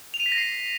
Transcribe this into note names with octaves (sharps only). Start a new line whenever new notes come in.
F7
D#7
B6
A#6
C7